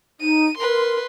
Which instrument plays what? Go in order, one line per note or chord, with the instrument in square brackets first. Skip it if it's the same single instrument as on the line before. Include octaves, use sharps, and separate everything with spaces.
[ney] D#4 [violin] D#7
[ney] A#4 [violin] B4 C6